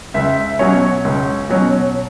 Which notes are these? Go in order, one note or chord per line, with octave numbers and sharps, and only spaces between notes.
C#2 E5
B2 F#3 C#4 C#5
C#2
B2 F#3 C#4